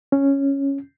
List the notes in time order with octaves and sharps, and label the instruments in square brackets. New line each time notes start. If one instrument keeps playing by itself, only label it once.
[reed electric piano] C#4